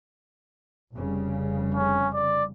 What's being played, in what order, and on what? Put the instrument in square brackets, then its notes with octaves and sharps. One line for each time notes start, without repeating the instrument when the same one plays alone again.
[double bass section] F1 C#3 G3
[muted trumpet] C#4
D5